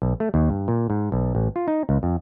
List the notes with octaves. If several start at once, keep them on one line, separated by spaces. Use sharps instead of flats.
B1
A3
D#2
G2
A#2
G#2
B1
A1
F4
D#4
C#2
F2